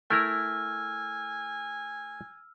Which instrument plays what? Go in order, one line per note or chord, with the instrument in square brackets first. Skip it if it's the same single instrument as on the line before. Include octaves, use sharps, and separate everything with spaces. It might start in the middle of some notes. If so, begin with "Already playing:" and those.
[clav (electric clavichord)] A3 E4 A#4 [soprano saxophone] G#5 [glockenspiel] E6 F6